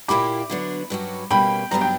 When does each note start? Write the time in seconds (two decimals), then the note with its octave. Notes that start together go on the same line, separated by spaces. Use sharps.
0.08 A#2 A#3 E4 G4 B5 D6
0.50 D3 F#3 B3 D4
0.90 G2 F#3 C#4 F#4
1.30 B2 G3 A#3 C#4 G5 B5
1.71 G2 F#3 B3 D4 G4 A#5
1.81 G5